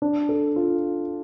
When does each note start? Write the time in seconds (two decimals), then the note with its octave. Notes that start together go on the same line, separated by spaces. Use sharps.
0.02 D4
0.29 A4
0.56 F4